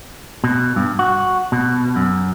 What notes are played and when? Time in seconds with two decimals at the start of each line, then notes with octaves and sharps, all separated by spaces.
0.44 B2
0.76 G2
0.99 F#4
1.52 B2
1.96 F#2